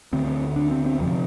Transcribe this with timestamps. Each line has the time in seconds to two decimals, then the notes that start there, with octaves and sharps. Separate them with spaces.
0.13 D2 D3 C4
0.56 D4
0.71 C4
0.86 C4
1.00 F2 C3 F3